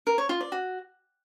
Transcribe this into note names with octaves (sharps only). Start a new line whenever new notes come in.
A#4
C#5
F4
D5
F#4